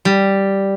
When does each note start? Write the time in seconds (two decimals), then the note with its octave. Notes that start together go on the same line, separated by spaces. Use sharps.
0.05 G3